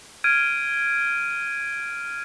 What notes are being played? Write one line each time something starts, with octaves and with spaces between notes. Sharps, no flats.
F6 G#6 D7 D#7